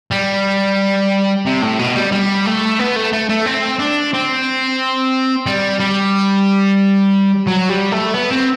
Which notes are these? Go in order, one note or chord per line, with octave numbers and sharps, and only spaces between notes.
G3
C3
A2
B2
G3
G3
A3
B3
A3
A3
A3
C4
D4
C4
G3
G3
F#3
G3
A3
B3
C4